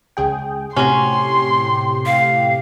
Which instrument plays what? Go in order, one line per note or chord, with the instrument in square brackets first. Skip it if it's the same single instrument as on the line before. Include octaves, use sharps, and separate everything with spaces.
[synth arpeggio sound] C#2 G#4 G5
[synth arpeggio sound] A2 C3 G4 [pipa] F#3 C#4 [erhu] C6
[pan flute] F5